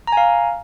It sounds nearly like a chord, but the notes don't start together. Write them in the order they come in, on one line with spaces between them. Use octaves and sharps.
A#5 G#5 F5